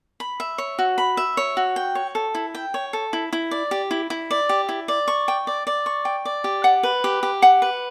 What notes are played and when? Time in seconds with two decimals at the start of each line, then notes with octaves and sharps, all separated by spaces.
0.20 B5
0.40 E5
0.58 C#5
0.79 F#4
0.98 B5
1.17 E5
1.37 C#5
1.57 F#4
1.76 G5
1.95 C#5
2.15 A4
2.35 E4
2.55 G5
2.74 C#5
2.93 A4
3.13 E4
3.33 E4
3.51 D5
3.71 G4
3.91 E4
4.10 E4
4.31 D5
4.49 G4
4.69 E4
4.88 D5
5.08 C#6
5.28 G5
5.47 D5
5.67 D5
5.86 C#6
6.05 G5
6.25 D5
6.44 G4
6.64 F#5
6.83 B4
7.04 G4
7.23 G4
7.42 F#5
7.62 B4